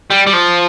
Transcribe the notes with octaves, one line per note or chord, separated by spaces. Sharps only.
G3
G3
F3